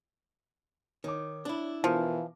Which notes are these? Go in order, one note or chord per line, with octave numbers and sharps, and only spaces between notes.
D#3 C#5 D6
D4 E4
B2 E3 F3 F4 A#4